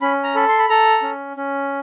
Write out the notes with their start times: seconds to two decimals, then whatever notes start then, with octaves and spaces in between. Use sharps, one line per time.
0.02 C#4 B5
0.24 A#5
0.35 A4 B5
0.48 C6
0.59 B5
0.69 A4 A#5
1.03 C#4
1.37 C#4